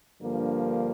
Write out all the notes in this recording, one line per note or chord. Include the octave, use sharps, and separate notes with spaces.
G2 D3 F3 A#3